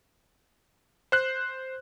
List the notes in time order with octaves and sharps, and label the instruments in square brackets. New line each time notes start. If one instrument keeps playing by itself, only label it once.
[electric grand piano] C5 F#6 C7